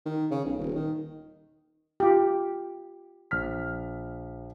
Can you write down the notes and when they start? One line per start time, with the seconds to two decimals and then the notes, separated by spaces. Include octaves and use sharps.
0.06 D#3
0.31 C#3
0.45 B1
0.58 D#1
0.75 D#3
2.00 F4 G4
3.31 A#1 F6 B6